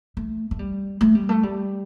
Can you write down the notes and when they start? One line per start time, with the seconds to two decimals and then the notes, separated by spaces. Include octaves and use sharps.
0.17 A3
0.51 A3
0.59 G3
1.01 A3
1.15 G3
1.29 A3
1.43 G3